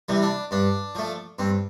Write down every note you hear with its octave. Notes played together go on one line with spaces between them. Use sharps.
C3 E3 G3
D4
G2 D4
F3 A3
G2 C4